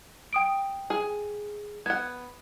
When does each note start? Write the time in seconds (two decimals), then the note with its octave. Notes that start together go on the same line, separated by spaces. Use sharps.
0.33 G5 D#6 D7
0.90 G#4
1.86 B3 F#5 G#6